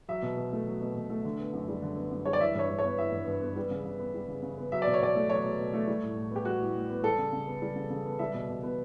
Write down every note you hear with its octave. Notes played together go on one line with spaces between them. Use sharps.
F#3 E5
B2
B2
A3
F#3
B2
B2
A3
D3
B3
F#2
G3
D3
B3
F#2
G3 C#5
D5
E3 E5
G2 C#5
G2
C#5
B3
E3 E5
G2
G2
B3
G3
C#3
C#3
B3
G3
C#3
C#3
B3
F#3 E5
D5
B2
C#5
B2 D5
A3
F#3 C#5
B2
B2
A3
G3
A2
A2
B3 G4
G3 F#4
A2
A2
B3
G3 A4
C#3
C#3
B3
G3
C#3
C#3
B3
G3 E5
B2
B2
B3